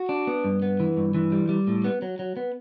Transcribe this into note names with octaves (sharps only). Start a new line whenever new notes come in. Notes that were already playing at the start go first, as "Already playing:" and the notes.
Already playing: F#4
D4
B3
G2
B3
E3
G2
E3
G3
G3
A2
B3
F#3
F#3
B3